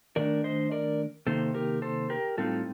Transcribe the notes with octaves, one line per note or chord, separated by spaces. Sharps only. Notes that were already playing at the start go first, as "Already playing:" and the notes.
D#3 A3 D4 A#4 D5
C5 D#5
A#4 D5
C3 D#3 A#3 D#4 A4 C5
G4 A#4
A4 C5
G4 A#4
A2 G3 C4 D#4 F4 A4